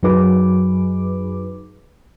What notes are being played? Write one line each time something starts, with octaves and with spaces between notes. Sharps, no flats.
F#2 F#3 D#4 G#4 B4 D6